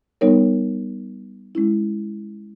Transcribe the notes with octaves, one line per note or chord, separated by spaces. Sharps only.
G3 B3 D#4 A#4 C#5
G#3 C#4 E4